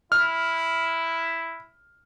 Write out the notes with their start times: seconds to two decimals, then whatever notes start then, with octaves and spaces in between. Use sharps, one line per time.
0.12 E4 F6